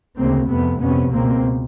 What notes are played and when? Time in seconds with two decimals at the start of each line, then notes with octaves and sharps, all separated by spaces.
0.18 D2 C#3 A#3 C4
0.50 F2 C3 A3 B3
0.81 F2 C3 B3 C#4
1.13 C#2 B2 A#3 C4